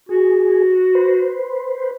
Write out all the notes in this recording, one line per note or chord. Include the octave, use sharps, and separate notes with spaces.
F#4 G#4
B4 C5